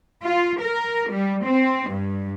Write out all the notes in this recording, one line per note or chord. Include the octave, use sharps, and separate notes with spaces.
F4
A#4
G3
C4
G2